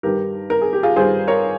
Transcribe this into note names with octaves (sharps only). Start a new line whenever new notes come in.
G2 D#3 G3 G4 A#4
A#4
G#4
G4
F4 G#4
G2 D#3 G3 G#4 C5
A#4 C#5